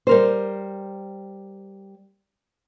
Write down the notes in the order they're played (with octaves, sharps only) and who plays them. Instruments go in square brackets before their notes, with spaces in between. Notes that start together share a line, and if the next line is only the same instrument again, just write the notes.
[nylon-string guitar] G3 A#4 C5